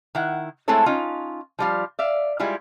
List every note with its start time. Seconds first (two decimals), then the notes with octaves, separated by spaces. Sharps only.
0.15 D#3 E4 F#5
0.68 G#3 A3 C4 E4 A4 C#5
0.86 C#4 D#4 F4
1.59 F3 G3 F4
1.99 D5 E5 F5
2.40 G3 G#3 E4 F4